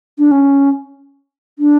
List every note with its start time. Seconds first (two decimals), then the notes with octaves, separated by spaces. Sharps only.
0.19 D4
0.31 C#4
1.59 D4